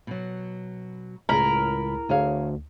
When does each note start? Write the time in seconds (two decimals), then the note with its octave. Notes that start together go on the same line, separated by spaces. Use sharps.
0.07 B2 F#3
1.29 C#2 A2 G#4 A#4 B5
2.09 D2 G#4 C#5 F5